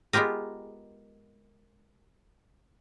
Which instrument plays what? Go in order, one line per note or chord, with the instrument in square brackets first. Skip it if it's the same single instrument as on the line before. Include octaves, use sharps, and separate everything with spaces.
[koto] G#3 B3 F4 G4 A#4